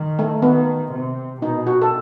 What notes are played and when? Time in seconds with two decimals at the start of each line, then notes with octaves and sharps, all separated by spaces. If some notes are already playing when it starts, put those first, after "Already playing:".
Already playing: D#3
0.19 A3
0.42 D#3 B3
0.92 C3
1.42 B2 D#4
1.67 F#4
1.82 A4